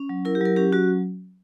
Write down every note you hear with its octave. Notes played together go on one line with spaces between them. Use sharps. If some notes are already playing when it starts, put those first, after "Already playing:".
Already playing: C#4
F#3
E4 A#4
G4
F#3 A#4
C#4 G4
F#3 F#4